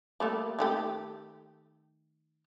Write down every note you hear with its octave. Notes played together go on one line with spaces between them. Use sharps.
G3 A3 A#3
D#3 A3 G4